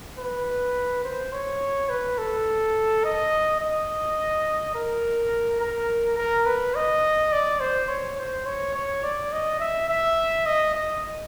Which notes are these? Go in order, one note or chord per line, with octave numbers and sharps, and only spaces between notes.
B4
C5
C#5
B4
A4
D#5
D#5
A#4
A#4
A#4
B4
D#5
D5
C5
C#5
C5
C#5
C#5
D5
D#5
E5
E5
D#5
D#5